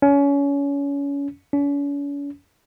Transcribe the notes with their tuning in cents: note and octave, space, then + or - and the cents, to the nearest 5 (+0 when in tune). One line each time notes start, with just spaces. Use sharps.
C#4 +25
C#4 +40